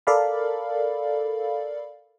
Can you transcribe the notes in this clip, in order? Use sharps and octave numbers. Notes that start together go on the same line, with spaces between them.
A4 A#4 D5 F5 B5